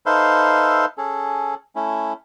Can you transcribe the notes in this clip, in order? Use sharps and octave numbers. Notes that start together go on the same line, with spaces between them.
D#4 A4 B4 C5 E5 F5
C#4 G#4 A4
A3 C#4 E4